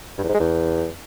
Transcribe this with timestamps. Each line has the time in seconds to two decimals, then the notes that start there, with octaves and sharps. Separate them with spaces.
0.18 G2
0.23 E2
0.29 G#2
0.34 G#3
0.40 E2